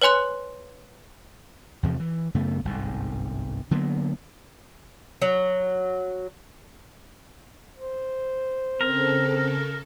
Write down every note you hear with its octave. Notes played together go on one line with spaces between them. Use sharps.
B4 C#5 G#5 C6 F#6
E2 C3 F3
E3
F#2 C#3 A3 B3
G1 C2 G#2
D3 F#3 A#3 B3
F#3
C5
C#3 C4 A4 A#4